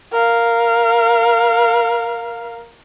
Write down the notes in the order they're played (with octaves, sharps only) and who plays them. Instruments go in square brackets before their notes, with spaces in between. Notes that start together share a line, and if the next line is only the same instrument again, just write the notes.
[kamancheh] A#4 F5